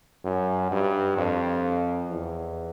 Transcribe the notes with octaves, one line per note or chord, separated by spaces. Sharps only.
F#2
G2
F2
E2